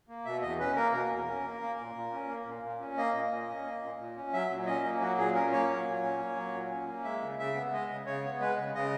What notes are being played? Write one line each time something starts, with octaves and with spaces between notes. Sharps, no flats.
A#3
B2 E5
E2 D#5
C#4 B4
A#3 A#4
B2 A#4
E2
C#4
A#3
A#3
A#2
A#2
C#4
A#3
A#2
A#2
C#4
A#3 D#5
A#2
A#2
C#4
A#3
A#2
A#2
C#4
F#3 E5
A#2
C#4 D#5
A#3
F#3 F#4
A#2 G#4
C#4 A#4
A#3 C#5
F#3
A#2
C#4
A#3
F#3
A#2
C#4
A#3
G#3 E5
C#3
C#3 E5
B3
G#3 D#5
C#3
C#3 C#5
B3
G#3 B4
C#3
C#3 D#5